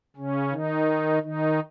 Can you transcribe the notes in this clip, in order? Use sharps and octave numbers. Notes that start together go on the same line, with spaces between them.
C#3 C#4
D#3 D#4
D#3 D#4